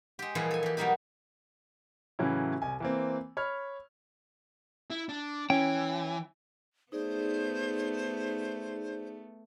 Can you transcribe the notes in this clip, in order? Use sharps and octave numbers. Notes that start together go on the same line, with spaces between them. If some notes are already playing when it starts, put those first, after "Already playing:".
G#3 G4
A#2 E3 F3 G3 G#4
A4 G#5
E3 G4
B2 F#3 G3 A#3 D#4 G4
A2 C#3 E3 F#3 C#4 E4
C2 G#5
E3 A#3 C4
C#5 B5 F6
E4
D4
E3 C#4 G5
A3 B3 D#4 G#4 C5 D5